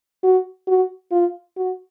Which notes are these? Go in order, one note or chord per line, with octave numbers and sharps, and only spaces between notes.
F#4
F#4
F4
F#4